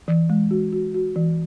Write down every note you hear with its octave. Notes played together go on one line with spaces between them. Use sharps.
E3
G#3
F#4
F#4
F#4
E3